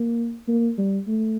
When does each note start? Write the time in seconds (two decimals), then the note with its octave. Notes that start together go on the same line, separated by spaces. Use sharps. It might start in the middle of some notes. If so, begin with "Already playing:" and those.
Already playing: A#3
0.48 A#3
0.78 G3
1.08 A3